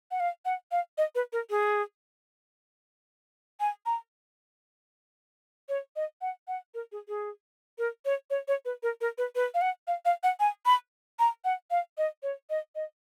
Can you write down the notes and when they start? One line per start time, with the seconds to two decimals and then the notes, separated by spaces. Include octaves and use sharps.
0.11 F#5
0.20 F5
0.45 F#5
0.71 F5
0.98 D#5
1.15 B4
1.32 A#4
1.50 G#4
3.60 G#5
3.86 A#5
5.69 C#5
5.96 D#5
6.21 F#5
6.48 F#5
6.74 A#4
6.92 G#4
7.08 G#4
7.78 A#4
8.05 C#5
8.30 C#5
8.48 C#5
8.65 B4
8.83 A#4
9.01 A#4
9.18 B4
9.35 B4
9.54 F5
9.61 F#5
9.87 F5
10.05 F5
10.23 F#5
10.40 G#5
10.66 B5
11.19 A#5
11.44 F#5
11.71 F5
11.98 D#5
12.23 C#5
12.50 D#5
12.75 D#5